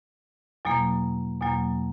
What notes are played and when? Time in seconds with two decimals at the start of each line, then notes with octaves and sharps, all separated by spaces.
0.65 E2 B2 F#3 A#3
1.41 E2 B2 F#3 A#3